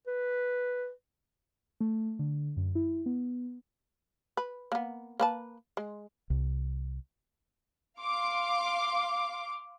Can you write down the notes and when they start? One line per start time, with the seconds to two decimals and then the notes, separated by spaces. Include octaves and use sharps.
0.07 B4
1.81 A3
2.19 D3
2.57 F#2
2.75 E4
3.06 B3
4.37 B4
4.72 A#3 B3
5.20 A#3 B4 A5
5.77 G#3
6.30 C2
8.00 F5 C6 D6